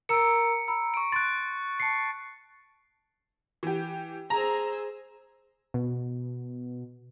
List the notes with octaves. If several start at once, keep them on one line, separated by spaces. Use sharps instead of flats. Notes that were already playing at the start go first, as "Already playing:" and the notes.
A#4 A#5 E6 C#7 D7
A#5 B5 E6
C#6 D7
C6 F#6 A6 D7
A5 C#6 C7 C#7
E3 G4
G#4 C5 A#5 E6
B2